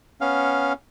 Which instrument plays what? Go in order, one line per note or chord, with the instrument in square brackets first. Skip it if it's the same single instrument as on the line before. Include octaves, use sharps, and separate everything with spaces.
[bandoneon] B3 C#4 F5